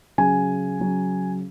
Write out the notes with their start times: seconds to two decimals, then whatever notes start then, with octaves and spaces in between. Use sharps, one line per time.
0.18 C#3 F#3 G#5
0.80 C#3 F#3